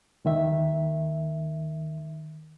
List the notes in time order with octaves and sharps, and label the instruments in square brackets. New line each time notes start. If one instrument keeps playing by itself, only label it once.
[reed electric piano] D#2 D#3 E5